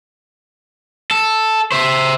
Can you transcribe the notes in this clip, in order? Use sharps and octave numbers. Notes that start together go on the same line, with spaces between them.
A4
C5 E5